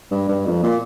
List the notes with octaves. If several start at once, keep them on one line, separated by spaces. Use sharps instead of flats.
G2
G2
F2
A#2